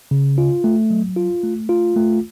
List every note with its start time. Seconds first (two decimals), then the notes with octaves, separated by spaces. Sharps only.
0.11 C#3
0.38 F4
0.64 A3
0.90 F#3
1.16 F4
1.43 A3
1.69 F4
1.96 A3